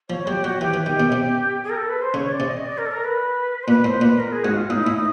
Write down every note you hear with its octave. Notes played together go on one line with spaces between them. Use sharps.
F3 C#5
F#3 G4
F#3 F#4
E3 G4
E3
D#3 G4
B2
C3
G#4
A#4
A4
B4
C5
C#3 C#5
D5
C3
D#5
D5
A#4
A4
A#4
B4
C5
A#2 B4
A2 C5
A#2 B4
A#4
G#4
G#2 F#4
F4
A2 D#4
A2 E4
D#4